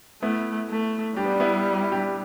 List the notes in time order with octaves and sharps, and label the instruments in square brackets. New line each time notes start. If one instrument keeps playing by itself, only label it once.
[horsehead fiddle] A3 [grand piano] B3 E4
[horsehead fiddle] A3
[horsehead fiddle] G3 [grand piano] D4 G4
[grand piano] B3
D4
B3 E4
G4
E4
D4 G4